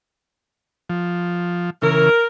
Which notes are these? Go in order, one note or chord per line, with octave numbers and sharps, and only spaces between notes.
F3
C#3 E3 A#4